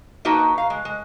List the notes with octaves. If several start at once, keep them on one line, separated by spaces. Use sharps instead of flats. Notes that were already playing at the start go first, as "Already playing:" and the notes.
A#3 D#4 F#4 B4 A5
F5
G#3
G#3